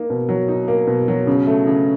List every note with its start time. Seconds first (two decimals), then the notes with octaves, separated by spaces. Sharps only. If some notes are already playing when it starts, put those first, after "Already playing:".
Already playing: A#3 D#4
0.10 B2
0.29 F#3
0.48 D#4
0.68 A#3
0.87 B2
1.08 F#3
1.27 C#3
1.47 A3
1.67 C#3